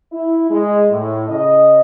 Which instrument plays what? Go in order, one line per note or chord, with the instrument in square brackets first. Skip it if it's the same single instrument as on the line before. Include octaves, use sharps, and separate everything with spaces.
[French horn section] E4
G#3
A2
C#3 D#5